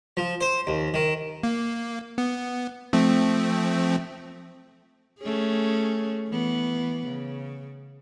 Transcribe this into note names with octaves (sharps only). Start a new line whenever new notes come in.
F3
C5
D#2
D#3
A#3
B3
F3 A3 C4
A3 C#4 G#4
E3 B3
C#3